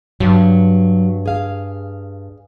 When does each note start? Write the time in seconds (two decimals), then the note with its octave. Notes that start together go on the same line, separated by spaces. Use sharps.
0.20 G2 F#3
1.26 G#4 F5